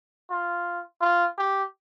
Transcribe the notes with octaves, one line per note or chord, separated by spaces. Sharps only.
F4
F4
G4